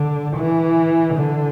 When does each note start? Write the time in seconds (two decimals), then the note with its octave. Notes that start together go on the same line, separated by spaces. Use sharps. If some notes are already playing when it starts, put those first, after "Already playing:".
Already playing: D3
0.36 E3
1.14 D3